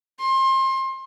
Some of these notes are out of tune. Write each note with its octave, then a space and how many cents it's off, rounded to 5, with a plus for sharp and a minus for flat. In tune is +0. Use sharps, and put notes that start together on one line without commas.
C6 +30